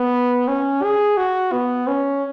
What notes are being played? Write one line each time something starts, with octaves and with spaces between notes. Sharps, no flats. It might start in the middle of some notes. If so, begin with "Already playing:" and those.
Already playing: B3
C#4
G#4
F#4
B3
C#4